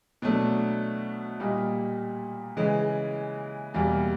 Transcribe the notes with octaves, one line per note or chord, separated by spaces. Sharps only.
B2 F#3 A3 D4
A#2 G3 A#3 D#4
C#3 E3 G#3
E2 B2 G3 A#3